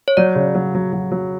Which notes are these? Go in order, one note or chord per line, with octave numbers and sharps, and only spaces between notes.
C#5
F#3 D5
C#3
F#3
F#3
F#3
F#3